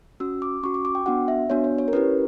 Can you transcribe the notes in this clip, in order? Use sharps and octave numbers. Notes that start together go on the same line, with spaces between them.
C#4 F#4 E6
D6
C#4 F#4 C#6
D6
D6
G5
B3 D4 F#4 F#5
E5
B3 D4 F#4 C#5
C#5
C#5
A#4
C#4 E4 G4 B4